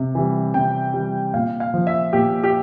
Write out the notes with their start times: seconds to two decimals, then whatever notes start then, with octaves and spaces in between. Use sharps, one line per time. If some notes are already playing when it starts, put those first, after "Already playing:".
Already playing: C3
0.15 E3 G3
0.54 C3 G5
0.94 E3 G3
1.34 A#2 F5
1.60 F5
1.74 F3
1.87 E5
2.13 A#2 G4
2.44 G4